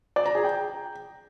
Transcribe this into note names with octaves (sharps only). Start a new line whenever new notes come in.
D5
A#5
G#4
G5